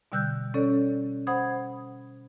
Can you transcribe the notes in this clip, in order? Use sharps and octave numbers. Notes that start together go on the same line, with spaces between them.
B2 D3 G3 E6 F#6 G6
C#4 A4 C#5 D5
C5 F#5 B5 D#6 G#6